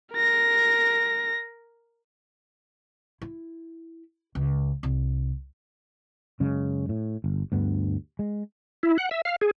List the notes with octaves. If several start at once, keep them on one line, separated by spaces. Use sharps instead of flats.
A#4 A#6
E4
C#2
C2
F#2 C#3 G#3
A2
G1
D2 G2 B3
G#3
E4
F#5
E5
F5
G#4